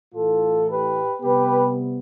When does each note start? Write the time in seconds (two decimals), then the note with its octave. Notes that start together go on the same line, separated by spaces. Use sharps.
0.14 A2 E3 A3 F4 A4
0.67 G4 B4
1.21 C3 G3 B3 G4 B4